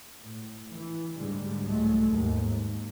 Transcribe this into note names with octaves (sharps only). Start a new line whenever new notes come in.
A2
E3
D2 G#2 D3 G3 G#3
C2 A2 F#3 G#3 A3
D#2 G#2
D#2